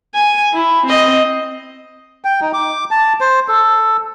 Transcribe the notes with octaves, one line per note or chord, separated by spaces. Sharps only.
G#5
E4
C4 D#5
G5
D#4
D6
A5
C5
A4